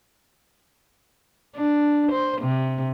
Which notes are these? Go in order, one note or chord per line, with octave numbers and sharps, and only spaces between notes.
D4
C5
C3